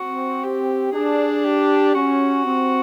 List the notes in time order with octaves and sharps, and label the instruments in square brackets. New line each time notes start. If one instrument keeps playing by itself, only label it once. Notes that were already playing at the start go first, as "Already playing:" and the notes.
Already playing: [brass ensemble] C4 [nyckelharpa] F#4
[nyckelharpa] G4
[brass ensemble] D4 [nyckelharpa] G#4
[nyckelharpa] G4
[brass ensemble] C#4 [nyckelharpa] F#4
[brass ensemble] C4